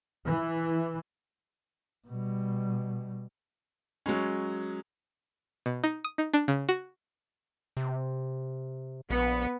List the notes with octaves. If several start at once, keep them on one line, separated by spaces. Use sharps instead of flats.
E3
B2 G3
F#3 G#3 C#4
B2
D#4
D#6
D#4
D4
C#3
F#4
C3
A#1 B3